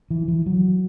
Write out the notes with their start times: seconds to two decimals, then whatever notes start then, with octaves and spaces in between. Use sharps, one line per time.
0.10 E3
0.28 E3
0.46 F#3